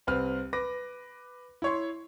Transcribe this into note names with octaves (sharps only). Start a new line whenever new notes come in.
C2 C4 B4 F6
B4 D6 A#6
E4 C#5 C6